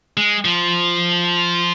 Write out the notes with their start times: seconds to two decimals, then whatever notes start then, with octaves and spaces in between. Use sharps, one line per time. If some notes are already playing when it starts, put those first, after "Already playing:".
0.17 G#3
0.45 F3